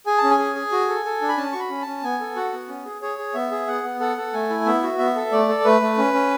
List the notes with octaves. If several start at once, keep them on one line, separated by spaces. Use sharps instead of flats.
G#4 G#5
A5
C#4
G#5
G#4
G#4
F#4
A4
A4
D4
B5
C#4 A5
F#4 C#6
B5
C#4
A5
C#4
B3 G#5
A4
F#4 F#5
B3
C#4
G#4
G#4 C#5
G#4
B3 E5
G#4
B3 F#5
B3
A4 F#5
A4
A3 G#5
E4
B3 E5
F#4
B3 E5
A4
A3 D5
A4
A3 B4
A3
C#4
C#4